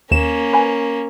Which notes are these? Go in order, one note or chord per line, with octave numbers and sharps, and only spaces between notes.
D#2 A#3 C#4 E7
B4 G#5